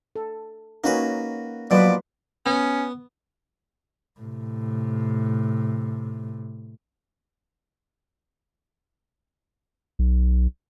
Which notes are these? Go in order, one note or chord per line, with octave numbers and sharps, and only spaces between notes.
A4
A#3 C#4 D#4 F#4 B4
B2 F3 F#3 A#3 F4 B4 D5
B3 C#4
A2 C3
B1